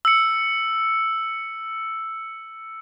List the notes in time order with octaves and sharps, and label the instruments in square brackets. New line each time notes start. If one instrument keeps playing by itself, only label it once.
[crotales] E6 C#7